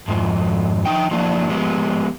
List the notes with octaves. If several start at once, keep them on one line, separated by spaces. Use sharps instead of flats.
F2 G#2 F3
F3 D#4 G5
F3 F#3 A#3 D4 E4
F3 G#3 B3 G4